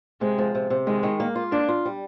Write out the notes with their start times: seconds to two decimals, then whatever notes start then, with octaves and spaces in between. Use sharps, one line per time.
0.21 C3 G#3
0.38 F3
0.55 C3
0.70 C3
0.87 D#3 G#3
1.03 D#3
1.20 A#3
1.35 F4
1.52 A#3 D4
1.68 F4
1.85 G3